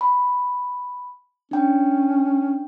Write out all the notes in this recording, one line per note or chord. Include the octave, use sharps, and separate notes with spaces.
B5
C#4 D4 G5